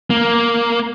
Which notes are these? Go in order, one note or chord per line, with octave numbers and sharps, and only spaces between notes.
A#3